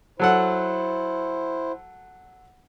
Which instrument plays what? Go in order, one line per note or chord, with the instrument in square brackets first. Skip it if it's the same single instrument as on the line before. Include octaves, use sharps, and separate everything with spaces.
[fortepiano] F#3 A4 F#5 [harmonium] E4 C5